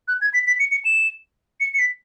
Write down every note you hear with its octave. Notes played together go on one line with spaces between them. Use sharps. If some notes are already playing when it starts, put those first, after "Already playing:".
F#6
G#6
B6
B6
C#7
C#7
E7
C#7
C#7
B6